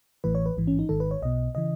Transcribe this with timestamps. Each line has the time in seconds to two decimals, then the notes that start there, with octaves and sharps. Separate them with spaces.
0.24 A1 A2 E3 B4
0.35 C#5
0.46 B4
0.57 A1 G#2 E3
0.67 C#4
0.79 D#4
0.89 G#1 G#2 D#3 A4
1.00 B4
1.11 C#5
1.22 B1 B2 D#5
1.55 C#3 E3 D#5